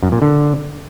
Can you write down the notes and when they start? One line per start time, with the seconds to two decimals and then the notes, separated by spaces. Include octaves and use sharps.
0.03 F#2
0.12 A#2
0.22 D3